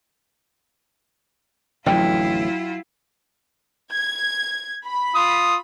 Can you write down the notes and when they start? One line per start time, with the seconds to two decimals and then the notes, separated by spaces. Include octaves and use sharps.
1.86 A1 F2 D3 F#3 E4 F4 G5
3.92 G#6
4.86 B5
5.15 F4 D#6